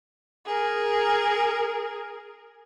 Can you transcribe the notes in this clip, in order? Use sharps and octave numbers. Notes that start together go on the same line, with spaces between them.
G#4 A#4